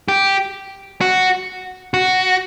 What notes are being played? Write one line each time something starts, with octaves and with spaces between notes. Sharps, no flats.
G4
F#4
F#4